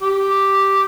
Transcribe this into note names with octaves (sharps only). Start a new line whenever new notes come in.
G4